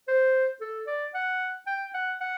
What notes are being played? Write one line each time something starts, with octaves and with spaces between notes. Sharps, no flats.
C5
A4
D5
F#5
G5
F#5
F#5